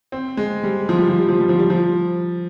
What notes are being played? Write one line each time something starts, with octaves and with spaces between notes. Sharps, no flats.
C4
G#3
G3
F3
G3
F3
G3
F3
G3
F3
G3
F3